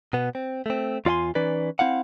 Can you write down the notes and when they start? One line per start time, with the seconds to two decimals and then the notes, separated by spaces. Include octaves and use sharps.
0.13 B2 B3
0.35 C4
0.66 A3 C4
1.05 E2 F4 D5 F#5 G#5 C6
1.35 E3 C#4 D#4 B4 D5
1.79 C4 E4 F5 F#5